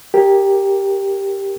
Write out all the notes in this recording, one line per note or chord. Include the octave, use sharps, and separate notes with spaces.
G4 A#4